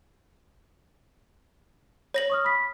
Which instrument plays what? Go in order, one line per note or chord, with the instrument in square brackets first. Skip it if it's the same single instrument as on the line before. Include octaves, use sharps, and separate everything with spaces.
[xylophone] C#5 A#6 F#7
[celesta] C#6 D#6 F6
B5 B6